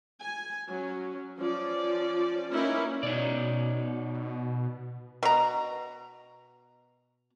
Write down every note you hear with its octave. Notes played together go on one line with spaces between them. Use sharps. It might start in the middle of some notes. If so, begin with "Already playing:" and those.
G#5
F#3 C#4
F3 C#4 D5
A#3 C#4 D#4 E4 A#4 B4
B2 D#4 C#5 D5
B2 A#5